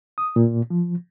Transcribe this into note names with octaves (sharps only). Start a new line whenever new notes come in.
D#6
A#2
F3